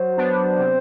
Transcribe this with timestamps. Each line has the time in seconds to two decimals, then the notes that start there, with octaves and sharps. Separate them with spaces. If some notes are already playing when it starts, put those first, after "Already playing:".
Already playing: F#3 C5
0.17 B3 D4
0.59 C3